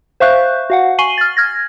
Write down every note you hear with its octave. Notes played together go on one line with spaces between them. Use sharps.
C5 E5 F5 C#6 F#6 G6
F#4 F5 F#5
G#5 C#6 C7 D#7 F#7 G7
F6 A6
F6 G#6 A#6